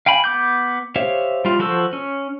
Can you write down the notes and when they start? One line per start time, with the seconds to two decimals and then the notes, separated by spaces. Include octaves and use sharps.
0.06 F5 G5 G#5 B5
0.24 B3 D6 G6
0.96 G4 C5 C#5 E5 F5
1.45 G3 F4
1.59 F3 F#4 A4 C5 E6
1.93 C#4